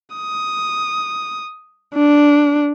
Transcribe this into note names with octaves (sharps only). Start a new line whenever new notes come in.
D#6
D4